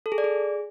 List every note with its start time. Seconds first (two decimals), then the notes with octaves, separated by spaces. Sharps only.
0.06 A4
0.12 G#4
0.18 D5
0.24 G#4